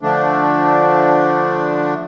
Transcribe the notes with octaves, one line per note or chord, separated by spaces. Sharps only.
D3 F3 A3 D4